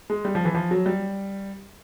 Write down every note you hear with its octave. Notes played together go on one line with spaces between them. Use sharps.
G#3
G3
F3
E3
F3
F#3
G3